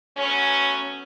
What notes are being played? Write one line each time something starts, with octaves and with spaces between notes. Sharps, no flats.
F#3 A3 B3 C#4